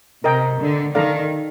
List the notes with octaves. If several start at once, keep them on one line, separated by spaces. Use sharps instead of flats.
C3 A#4 D#5 G5
D3
D#3 A4 D5 F5 A#5